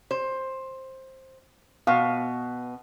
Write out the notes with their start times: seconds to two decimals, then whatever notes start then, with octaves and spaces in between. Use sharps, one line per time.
0.11 C5
1.87 B2 B3 F5